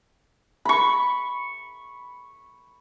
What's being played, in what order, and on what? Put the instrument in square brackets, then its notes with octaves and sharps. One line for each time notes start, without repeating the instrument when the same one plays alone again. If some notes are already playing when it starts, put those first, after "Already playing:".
[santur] B5 C#6